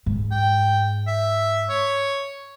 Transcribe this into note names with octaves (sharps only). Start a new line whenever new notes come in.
G#2
G5
E5
C#5